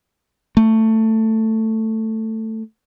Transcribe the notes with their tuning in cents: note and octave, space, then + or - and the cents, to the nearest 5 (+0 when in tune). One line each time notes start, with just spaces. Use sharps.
A3 +10